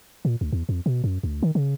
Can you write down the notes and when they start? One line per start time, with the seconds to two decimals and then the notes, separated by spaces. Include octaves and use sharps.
0.25 A#2
0.41 D2
0.53 E2
0.69 F2
0.86 B2
1.04 F#2
1.23 D2
1.43 D#3
1.55 C#3